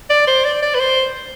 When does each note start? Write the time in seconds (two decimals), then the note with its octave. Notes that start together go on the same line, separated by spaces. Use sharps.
0.10 D5
0.27 C5
0.45 D5
0.62 D5
0.75 B4
0.80 C5